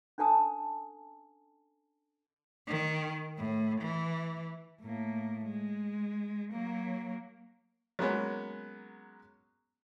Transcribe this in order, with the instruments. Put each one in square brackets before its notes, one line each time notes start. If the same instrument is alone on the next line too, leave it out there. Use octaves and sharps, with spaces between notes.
[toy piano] C#4 D4 A4 G#5 A5 D#6
[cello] D#3
A2
E3
A2 A#3
G#3
F#3 A#3
[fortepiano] F#3 G#3 A#3 B3 C#4